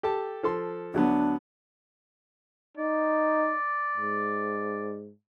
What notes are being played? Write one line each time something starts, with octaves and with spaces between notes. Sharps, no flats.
G4 A4 A5
F3 A4 C6
D2 F#3 B3 D4
D#4 D5
G#2